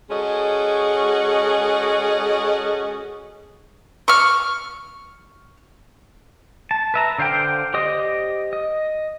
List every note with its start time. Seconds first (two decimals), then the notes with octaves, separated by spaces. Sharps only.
0.10 G#3 C#4 F#4 A4 D#5
4.08 C#6 F6
6.71 A5
6.94 B4 E5 A#5
7.18 D3 C5 F5 G5
7.74 G4 C5 D5 D#5 D#6
8.53 D#5